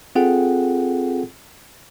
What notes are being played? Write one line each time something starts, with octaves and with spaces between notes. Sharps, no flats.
C4 F4 G#4 A4 F#5 G5